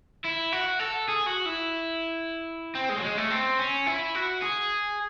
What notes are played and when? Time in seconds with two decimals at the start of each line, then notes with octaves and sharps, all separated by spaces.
0.24 E4
0.52 F#4
0.79 A4
1.08 G#4
1.26 F#4
1.46 E4
2.75 C4
2.89 G#3
2.97 F#3
3.03 G#3
3.18 A3
3.31 C4
3.59 C#4
3.87 E4
4.15 F#4
4.42 G#4